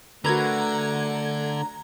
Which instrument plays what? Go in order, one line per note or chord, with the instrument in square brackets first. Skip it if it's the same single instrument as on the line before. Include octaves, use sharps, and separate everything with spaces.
[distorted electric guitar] D3 [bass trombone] A3 [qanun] F#4 A#4 B4 [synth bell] A#5 G#6